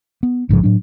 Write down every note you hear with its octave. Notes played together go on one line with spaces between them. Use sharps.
B3
A#1 G#2 C#3 F3
A2 F#3 D4